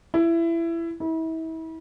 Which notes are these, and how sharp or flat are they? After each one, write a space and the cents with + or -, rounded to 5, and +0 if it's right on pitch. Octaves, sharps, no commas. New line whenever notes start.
E4 +20
E4 -35